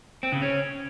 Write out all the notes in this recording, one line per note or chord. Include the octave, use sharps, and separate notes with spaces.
C4
C#3
C#4